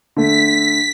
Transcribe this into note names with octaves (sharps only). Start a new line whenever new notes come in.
D3 A3 B6